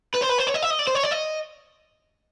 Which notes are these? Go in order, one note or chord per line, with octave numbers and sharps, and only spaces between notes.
B4
C5
B4
C5
C#5
D#5
E5
D#5
D5
C5
C#5
D5
D#5